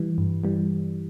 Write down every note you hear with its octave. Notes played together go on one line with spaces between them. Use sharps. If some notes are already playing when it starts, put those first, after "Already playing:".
Already playing: E3 G3
G2
E3 G3